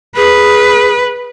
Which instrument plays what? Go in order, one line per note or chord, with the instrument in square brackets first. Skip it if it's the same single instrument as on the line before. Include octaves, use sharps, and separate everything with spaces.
[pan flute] G#4 [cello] B4